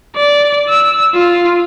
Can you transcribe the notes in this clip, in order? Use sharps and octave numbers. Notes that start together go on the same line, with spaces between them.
D5
E6
F4